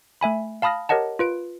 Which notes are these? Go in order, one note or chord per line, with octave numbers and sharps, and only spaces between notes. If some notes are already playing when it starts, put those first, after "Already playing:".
A3 E5 G#5 B5
F5 A5 B5 D#6 F6 A#6
G4 A#4 C#5 D#5 F#5 A5
F4 B4 D7